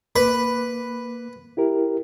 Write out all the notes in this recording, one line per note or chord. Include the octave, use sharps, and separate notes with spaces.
A#3 B4 D6
E4 G4 A#4